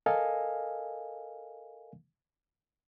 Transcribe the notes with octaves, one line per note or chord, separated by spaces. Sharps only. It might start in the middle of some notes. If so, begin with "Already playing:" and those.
A4 A#4 D#5 F5 G#5